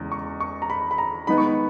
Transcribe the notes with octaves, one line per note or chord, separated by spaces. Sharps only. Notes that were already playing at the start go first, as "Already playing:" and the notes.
Already playing: E2 C#3 G#3 A#5
C#6
C#6
A#5
B5
B5
A#5
D#3 G#3 B3 D#4 B5
C#6
B5